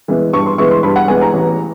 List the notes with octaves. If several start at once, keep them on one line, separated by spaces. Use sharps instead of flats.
E3 G#3 B3
G2 C#6
C6
E3 G#3 B3 C#6
C6
G2 B5
F#5
E3 G#3 B3 G#5
A#5
A1